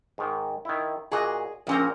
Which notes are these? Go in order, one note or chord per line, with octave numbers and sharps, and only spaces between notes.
G#2 D#3
D#3 E4
A#2 F#4 G#4 D#5
A#1 A#2 F3 C4 C#4 A#4